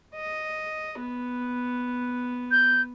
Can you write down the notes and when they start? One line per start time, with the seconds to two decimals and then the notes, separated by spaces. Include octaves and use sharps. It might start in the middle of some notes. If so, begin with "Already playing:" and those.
0.15 D#5
0.99 B3
2.51 G6